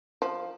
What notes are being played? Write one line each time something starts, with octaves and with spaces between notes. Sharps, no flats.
F3